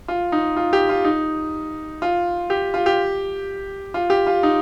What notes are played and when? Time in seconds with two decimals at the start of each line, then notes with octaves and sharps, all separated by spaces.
0.08 F4
0.32 D#4
0.57 F4
0.73 G4
0.89 F4
1.05 D#4
2.02 F4
2.50 G4
2.74 F4
2.86 G4
3.94 F4
4.10 G4
4.27 F4
4.43 D#4